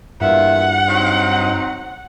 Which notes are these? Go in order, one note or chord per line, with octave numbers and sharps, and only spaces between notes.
E2 G2 A#2 E5 F#5
F#3 C4 D#4